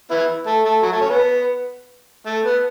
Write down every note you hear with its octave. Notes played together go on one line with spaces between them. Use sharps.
B3 E4
A3
A3
F#3
A3
C#4
B3
A3
B3